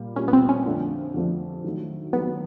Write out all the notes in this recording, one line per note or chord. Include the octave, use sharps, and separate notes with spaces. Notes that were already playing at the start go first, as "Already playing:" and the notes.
Already playing: A#2 G3 A#3
A#2 G3 A#3 C#4
B3
C4
C#4
F2 D3 F3 A3 D4
F2 D3 F3 A3 D4
D#3 F#3 A3
D#3 F#3 A3 B3